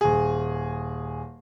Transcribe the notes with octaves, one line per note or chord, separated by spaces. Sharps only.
D#1 G#4